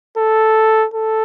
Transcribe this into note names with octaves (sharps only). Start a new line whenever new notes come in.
A4
A4